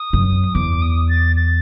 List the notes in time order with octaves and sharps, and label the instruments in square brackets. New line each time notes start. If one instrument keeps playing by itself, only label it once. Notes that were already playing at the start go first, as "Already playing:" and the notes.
Already playing: [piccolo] D#6
[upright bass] F#2
[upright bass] E2 [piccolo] D6
[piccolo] D#6
A6
A6